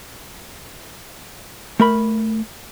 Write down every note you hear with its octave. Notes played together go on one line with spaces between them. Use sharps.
A3 A#4 B5